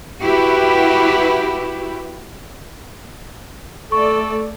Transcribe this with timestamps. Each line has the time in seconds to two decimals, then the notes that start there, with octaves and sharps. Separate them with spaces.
0.21 E4 F#4 G4 B4
3.92 A3 A4 D5 C#6